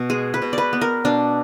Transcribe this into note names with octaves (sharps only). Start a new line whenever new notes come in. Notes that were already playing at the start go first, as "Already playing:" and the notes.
Already playing: B2
G#3 G#4
B4
B2
B4 D5
B3
A#4
B2 D4